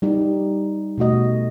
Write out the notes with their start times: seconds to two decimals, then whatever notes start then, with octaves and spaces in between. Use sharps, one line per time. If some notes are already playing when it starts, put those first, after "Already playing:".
0.02 G3 D#4 G4
0.98 B2 A3 F#4 D#5